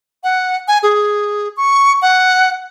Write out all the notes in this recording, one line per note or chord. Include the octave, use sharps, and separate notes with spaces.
F#5
G#5
G#4
C#6
F#5